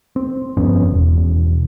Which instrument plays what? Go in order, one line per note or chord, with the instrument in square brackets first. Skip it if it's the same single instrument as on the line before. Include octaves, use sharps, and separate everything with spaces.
[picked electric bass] C4
G1 F2 B3 C#4
E1